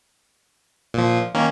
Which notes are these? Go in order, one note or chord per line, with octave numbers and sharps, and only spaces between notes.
A#2 F3
D#3 A#3 C#4